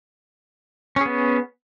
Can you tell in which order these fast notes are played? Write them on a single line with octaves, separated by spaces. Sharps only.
C#4 G#4 B3